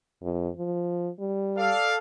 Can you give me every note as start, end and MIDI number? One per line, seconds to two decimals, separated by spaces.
0.22 0.49 41
0.57 1.09 53
1.19 1.72 55
1.57 1.96 69
1.57 1.96 74
1.57 1.96 77